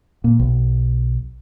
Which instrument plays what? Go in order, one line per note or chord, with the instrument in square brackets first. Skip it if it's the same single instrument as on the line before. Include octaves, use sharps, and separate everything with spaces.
[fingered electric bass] A#2
B1